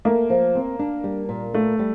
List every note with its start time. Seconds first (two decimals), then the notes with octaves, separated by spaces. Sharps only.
0.05 A3 A#3
0.30 F3
0.55 C4
0.79 D4
1.04 G3
1.29 A#2
1.54 A3 A#3
1.79 G3